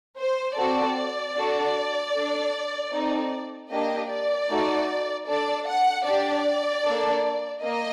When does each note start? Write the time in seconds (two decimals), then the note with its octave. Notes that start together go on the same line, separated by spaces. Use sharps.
0.18 C5
0.56 C4 F#4 A4 D5
1.36 D4 F#4 A4
2.13 D4 A4
2.92 C4 D#4 A4
3.70 A#3 D4 G4 D#5
4.10 D5
4.49 A3 D#4 F#4 A4
5.27 D4 A4 D5
5.67 F#5
6.06 D4 G4 D5
6.84 A#3 D4 A4
7.62 A#3 D#5